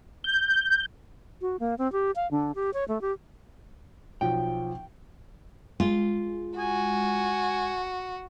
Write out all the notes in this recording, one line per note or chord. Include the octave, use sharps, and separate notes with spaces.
G6
F#4
A#3
C4
G4
F5
D3
G4
C#5
A3
G4
B1 F3 G5
G#3 F4
F#4 G#5